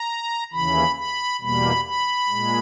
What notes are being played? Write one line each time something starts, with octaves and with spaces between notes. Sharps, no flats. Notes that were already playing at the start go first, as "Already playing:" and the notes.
Already playing: A#5
D#2 C#3 E3 B5
B5
E2 B2 G3 A#3 B5
B5
A#2 G#3